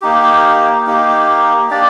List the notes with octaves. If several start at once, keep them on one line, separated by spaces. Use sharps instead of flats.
A#3 D#4 G4
A#3 D#4 G4
A#3 D4 G4 D5